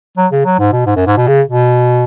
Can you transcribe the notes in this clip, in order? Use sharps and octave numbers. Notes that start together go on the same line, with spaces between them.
F#3
C#3
F#3
G#2
B2
G#2
F#2
G#2
B2
C#3
B2